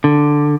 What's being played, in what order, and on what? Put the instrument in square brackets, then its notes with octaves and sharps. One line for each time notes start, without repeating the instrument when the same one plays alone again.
[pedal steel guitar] D3